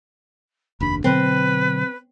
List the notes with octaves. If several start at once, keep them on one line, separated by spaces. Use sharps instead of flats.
F1 D#2 D4 B5
B2 D3 F#3 C4 B4